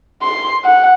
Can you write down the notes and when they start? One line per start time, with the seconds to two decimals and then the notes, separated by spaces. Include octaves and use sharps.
0.22 C6
0.65 F#5